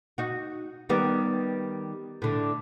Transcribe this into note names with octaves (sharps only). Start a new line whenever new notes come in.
D#4 F#4
D#3 G3 B3
A2 D3